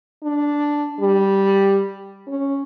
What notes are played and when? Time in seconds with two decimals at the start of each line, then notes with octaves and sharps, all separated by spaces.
0.24 D4
1.00 G3
2.28 C#4